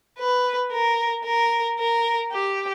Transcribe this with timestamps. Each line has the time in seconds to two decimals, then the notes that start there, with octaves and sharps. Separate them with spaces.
0.19 B4
0.72 A#4
1.25 A#4
1.79 A#4
2.32 G4